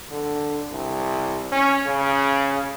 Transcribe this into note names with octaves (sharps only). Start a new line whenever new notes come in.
D3
C2
C#4
C#3